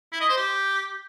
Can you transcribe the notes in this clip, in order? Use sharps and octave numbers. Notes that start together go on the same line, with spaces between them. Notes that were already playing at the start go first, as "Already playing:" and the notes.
E4
D#5
C5
G4